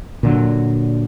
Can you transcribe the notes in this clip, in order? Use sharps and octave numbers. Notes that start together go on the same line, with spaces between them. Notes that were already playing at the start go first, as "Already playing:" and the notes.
A#2 D3 F#3